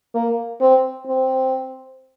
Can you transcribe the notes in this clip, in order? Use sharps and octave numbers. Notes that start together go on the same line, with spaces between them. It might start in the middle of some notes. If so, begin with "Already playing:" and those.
A#3
C4
C4